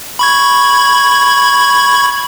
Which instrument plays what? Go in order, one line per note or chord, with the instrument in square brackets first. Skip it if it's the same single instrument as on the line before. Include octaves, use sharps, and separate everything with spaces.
[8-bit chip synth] B5 C#6 G#6